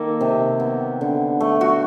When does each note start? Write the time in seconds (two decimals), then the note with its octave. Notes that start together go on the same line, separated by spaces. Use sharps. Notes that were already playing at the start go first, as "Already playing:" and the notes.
Already playing: D#3 A#3 A4
0.21 C3
0.60 B3
1.01 D3
1.41 A3
1.61 F#4